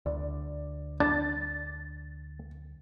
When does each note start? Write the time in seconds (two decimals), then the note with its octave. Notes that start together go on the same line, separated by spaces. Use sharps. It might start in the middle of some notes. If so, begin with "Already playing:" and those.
0.06 D2 D5
1.00 D4 A6